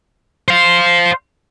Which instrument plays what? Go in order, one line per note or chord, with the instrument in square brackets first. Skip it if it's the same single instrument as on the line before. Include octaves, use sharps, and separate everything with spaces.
[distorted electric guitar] C5 F5